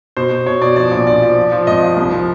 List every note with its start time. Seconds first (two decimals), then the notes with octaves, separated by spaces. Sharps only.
0.17 B2 C5
0.31 B2
0.46 B2 C#5
0.61 B2 D5
0.76 F3 D5
0.91 A#1
1.07 A#1 D5
1.22 F3
1.37 F3
1.52 F3
1.67 G#1 D#5
1.82 F3
1.97 C2
2.12 F3